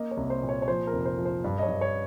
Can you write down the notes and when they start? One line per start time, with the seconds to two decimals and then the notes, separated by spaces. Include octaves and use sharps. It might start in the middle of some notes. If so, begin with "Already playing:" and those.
Already playing: A#3 D#5
0.11 C#5
0.17 C2
0.30 C5
0.43 A#2
0.49 C#5
0.62 C#5
0.68 F3 C5
0.87 A#4
0.93 F1
1.05 C5
1.18 F3
1.25 C5
1.44 G2
1.58 D#5
1.63 C#5
1.68 G2
1.81 C#5